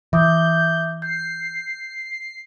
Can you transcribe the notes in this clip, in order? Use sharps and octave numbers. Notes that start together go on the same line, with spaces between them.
E3 E5 D6 D#6 G6
G6 C7